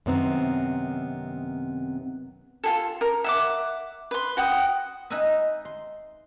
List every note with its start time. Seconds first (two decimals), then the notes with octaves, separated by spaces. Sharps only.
0.06 F#2 C3 D#3 B3 C4 A#5
2.64 F4 G#4 A4
3.01 A#4
3.24 E5 F#5 D6
4.11 B4 C6
4.37 F#4 F#5 G5 D#6
5.10 D#4 B4 E5 G#5 B5
5.65 C6